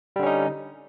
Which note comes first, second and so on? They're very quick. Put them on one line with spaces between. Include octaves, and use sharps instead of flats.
G3 D3 C#4 D#4